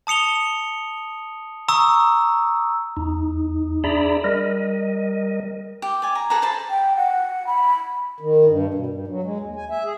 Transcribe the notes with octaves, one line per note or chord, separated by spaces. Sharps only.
A5 D#6 C#7 F7 G7
A#5 C#6 D#6 E6
E2 D#4
D4 G#4 D5 E5 A#5 B5
G3 A#4 D#5
G4
D5 G#5
A#5
G#4 A4 B4 A#5
C5 A5 B5
G5
F#5
B5
D#3
G2
B2
G2
F#3
G#3
D#2
G#5
E5
G#4